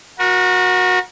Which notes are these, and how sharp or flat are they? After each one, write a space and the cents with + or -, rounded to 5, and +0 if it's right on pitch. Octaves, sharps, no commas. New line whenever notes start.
F#4 -20 A#4 +30